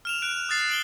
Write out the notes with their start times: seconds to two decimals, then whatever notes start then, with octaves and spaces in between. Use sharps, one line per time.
0.05 F6 E7 F7
0.22 F#6 D7
0.49 D#6 F#6 A6 C7
0.70 D7 F#7 G7